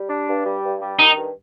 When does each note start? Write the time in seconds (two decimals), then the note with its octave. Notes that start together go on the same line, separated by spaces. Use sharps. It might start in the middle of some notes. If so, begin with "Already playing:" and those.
Already playing: G3
0.10 D4
0.28 G2
0.46 G3
0.64 G2
0.82 G3
0.99 D#3 D#4
1.17 G2